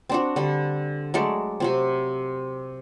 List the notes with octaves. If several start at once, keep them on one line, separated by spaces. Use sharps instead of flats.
C4 D4 F#4
D3 G3
F#3 G#3 A3 D5
C3 F#3 C4